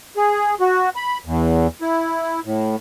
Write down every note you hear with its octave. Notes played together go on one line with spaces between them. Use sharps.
G#4
F#4
B5
E2
E4
A2